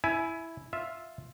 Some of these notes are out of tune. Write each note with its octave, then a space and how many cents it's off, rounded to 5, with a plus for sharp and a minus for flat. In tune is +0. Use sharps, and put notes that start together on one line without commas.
E4 +0 G#5 +20
F4 +0 E5 +0